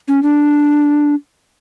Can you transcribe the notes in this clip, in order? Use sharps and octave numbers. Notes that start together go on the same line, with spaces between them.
C#4
D4